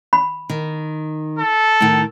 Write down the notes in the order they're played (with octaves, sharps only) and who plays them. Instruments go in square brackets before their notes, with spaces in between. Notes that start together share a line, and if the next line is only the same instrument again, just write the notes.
[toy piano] B5
[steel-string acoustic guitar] D#3
[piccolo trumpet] A4
[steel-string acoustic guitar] A2 D#3